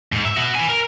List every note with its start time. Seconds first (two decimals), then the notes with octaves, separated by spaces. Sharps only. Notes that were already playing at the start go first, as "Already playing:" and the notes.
0.12 G#2
0.25 E5
0.37 B3 F#4
0.55 B4 G#5
0.69 A#4